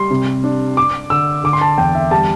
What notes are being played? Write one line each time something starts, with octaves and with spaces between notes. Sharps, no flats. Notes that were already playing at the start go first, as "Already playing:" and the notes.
Already playing: G3 C6
C3
D4
D4 D6
D3 E6
D3 D6
C6
A5
E2 G5
E5
G3 A5